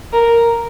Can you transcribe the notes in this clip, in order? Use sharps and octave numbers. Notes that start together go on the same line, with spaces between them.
A#4